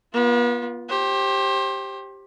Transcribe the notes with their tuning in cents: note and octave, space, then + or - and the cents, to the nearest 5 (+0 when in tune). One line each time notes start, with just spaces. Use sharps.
B3 -40 F4 +0
G4 +0 C5 +30